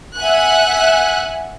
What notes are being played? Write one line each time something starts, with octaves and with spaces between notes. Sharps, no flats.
E5 F#5 G#5 F#6